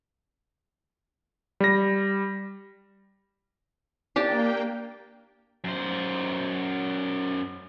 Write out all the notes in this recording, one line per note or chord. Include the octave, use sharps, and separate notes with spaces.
G3 A#6
A#3 D4 G4 G5 A5
F#2 C5